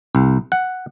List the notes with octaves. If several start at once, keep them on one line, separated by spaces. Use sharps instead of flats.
C2
F#5